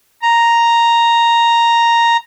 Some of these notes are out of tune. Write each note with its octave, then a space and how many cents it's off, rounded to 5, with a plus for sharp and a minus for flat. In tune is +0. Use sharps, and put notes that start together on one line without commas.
A#5 +0